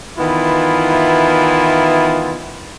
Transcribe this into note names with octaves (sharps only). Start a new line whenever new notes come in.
D#3 E3 B3 E4 F4